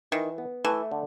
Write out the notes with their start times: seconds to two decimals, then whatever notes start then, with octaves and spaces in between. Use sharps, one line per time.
0.12 D#3 E3
0.38 B3
0.65 E3 A3
0.92 D3